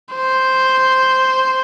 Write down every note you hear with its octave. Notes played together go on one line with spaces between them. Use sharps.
C5